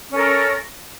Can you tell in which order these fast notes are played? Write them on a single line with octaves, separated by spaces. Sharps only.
C#4 A4 A#4